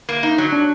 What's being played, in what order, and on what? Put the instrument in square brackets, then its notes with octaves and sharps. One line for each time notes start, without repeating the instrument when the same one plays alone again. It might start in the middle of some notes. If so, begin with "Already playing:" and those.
[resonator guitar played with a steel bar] A#3
D#4
F#3
[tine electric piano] D4